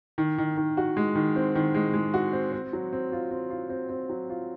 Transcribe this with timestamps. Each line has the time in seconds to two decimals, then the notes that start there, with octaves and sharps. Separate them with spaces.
0.18 D#3
0.38 D#3
0.57 D#3
0.77 F#4
0.97 G#3
1.15 D#3
1.36 C4
1.55 D#3
1.75 G#3
1.94 G#3
2.14 F#4
2.33 C4
2.52 C4
2.73 F#3
2.93 C4
3.12 F4
3.31 C4
3.50 F4
3.70 C4
3.89 C4
4.09 F#3
4.30 F4